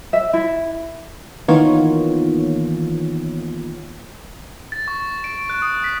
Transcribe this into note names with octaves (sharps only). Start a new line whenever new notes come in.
E5
E4
D#3 E3 A#3 B3 F4 C#5
A6
C#6
D7
F#6
D#6
B6